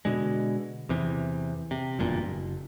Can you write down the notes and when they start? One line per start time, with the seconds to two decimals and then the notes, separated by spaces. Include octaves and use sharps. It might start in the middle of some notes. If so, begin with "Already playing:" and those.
0.05 B2 D3 G#3
0.89 E2 C3 E3
1.71 C3
1.99 F#1 E2 G2 A#2
2.23 F#1